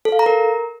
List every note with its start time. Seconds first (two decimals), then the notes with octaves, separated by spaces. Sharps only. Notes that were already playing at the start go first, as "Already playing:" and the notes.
0.05 A4
0.12 F5
0.19 A#5
0.26 A#4